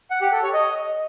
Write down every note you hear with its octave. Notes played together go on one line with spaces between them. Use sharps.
F#5
G4
A4
C#5
D#5